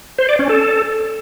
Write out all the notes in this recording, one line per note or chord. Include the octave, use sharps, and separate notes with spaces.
C5
D5
C#4
A4